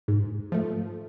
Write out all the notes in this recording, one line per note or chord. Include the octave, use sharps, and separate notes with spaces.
G#2
F3 A3